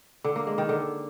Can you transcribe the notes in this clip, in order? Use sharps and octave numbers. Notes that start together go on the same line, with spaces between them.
D3
A#3
G#3
D#3
D3